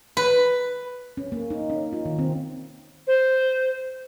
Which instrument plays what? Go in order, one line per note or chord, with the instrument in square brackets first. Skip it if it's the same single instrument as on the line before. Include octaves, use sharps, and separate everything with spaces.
[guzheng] B4
[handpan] C#4
A#3
D#4
C#4
F4
D#3
C4
[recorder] C5